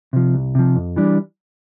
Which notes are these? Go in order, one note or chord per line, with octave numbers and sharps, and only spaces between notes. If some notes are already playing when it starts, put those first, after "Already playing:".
C3 F3
C2
C3 F3
F2
E3 G3 D4